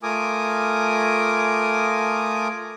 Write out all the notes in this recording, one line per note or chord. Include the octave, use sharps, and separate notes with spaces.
A3 F4 A#4 G#5 D6 D#6